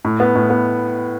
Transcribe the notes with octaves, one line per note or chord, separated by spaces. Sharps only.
A2
B3
A2
B3